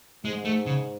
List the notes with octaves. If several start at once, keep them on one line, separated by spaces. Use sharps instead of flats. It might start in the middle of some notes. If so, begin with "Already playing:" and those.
G#2 G#3
A3
C#3